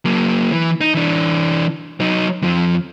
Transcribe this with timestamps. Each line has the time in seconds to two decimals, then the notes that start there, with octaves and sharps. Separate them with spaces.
0.05 F#3 A#3
0.52 E3
0.81 D#4
0.95 E3 D4
2.00 F#3 D#4
2.42 F2 F3